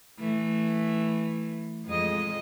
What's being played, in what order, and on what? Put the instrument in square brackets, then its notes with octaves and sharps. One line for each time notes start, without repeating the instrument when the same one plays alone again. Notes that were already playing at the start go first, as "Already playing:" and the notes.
[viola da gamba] E3 A3
F2 G#3 D#5